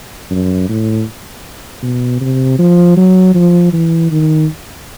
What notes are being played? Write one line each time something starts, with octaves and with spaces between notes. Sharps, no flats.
F#2
A2
B2
C3
F3
F#3
F3
E3
D#3